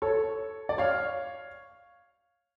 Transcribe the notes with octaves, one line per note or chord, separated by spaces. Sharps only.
A4 C#5
D5
C#5 F5